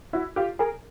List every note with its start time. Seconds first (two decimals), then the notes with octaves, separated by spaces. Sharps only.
0.13 E4 F#4
0.36 F4 G4
0.59 G#4 A#4